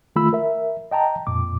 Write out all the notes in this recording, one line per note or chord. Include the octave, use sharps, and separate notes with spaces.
D#3 A3 F4 B5 E6
A#4 E5
D#5 G5 A5 A#5
F2 A#2 D6